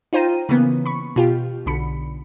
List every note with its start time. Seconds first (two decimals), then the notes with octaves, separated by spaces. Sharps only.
0.13 D#4 F4 C5 G5 A#5 D#7
0.49 C#3 E3 A#3 B3
0.86 B5 C#6
1.16 B2 F4 G4
1.66 B1 D3 B5 C#7